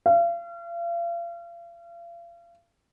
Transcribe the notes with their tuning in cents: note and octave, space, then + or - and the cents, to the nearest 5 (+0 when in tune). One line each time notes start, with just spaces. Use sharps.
F5 -40